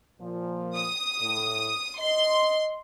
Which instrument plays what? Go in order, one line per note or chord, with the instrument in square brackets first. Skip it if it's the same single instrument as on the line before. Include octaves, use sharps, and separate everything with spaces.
[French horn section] A#2 F3
[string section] D#6
[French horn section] A2
[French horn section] D#5 [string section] C6